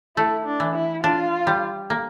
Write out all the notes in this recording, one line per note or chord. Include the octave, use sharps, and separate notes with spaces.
A3 E4
D4
E3
E4
D4 F4
G3
A#3